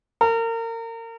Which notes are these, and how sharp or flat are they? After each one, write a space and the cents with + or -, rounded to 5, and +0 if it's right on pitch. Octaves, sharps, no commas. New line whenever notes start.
A#4 -30